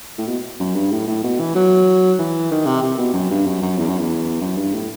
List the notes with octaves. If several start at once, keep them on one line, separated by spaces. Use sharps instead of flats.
A2
B2
F#2
G2
A2
A2
B2
E3
F#3
E3
D#3
C3
C3
B2
F#2
G2
F#2
F#2
E2
F#2
E2
F#2
G2
A2